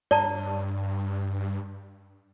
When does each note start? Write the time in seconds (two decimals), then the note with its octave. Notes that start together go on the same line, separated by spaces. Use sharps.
0.11 G2 D5 A5 A#5